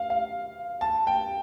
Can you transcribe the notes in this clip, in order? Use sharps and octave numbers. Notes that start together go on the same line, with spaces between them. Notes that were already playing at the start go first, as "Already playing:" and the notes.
Already playing: F5
F5
A5
G5